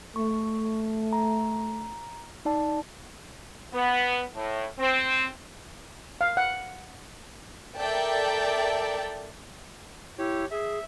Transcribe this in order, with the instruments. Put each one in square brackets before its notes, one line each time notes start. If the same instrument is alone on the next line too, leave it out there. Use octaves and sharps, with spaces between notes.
[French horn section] A3 [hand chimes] C#6
[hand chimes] A#5
D#4 D5 A5
[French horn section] B3
A2
C4
[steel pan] F5
F#5
[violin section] A4 A#4 D5 E5 G5 A5
[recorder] E4 [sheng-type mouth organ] G4 C#5
[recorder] G#4 [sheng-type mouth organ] E5